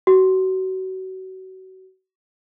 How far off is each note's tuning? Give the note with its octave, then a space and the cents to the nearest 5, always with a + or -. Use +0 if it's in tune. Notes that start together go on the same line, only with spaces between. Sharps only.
F#4 +30